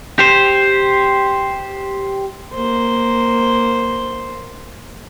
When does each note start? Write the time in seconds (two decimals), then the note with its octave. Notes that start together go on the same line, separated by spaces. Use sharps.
0.19 G4 C5
2.54 A#3 C5